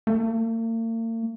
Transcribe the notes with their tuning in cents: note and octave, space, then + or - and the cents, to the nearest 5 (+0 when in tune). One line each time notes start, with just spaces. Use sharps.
A#3 -45